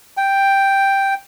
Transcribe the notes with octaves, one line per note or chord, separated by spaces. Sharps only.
G5